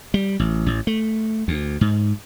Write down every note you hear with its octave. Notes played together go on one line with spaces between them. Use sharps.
G3
A1
A1
A3
D2
G#2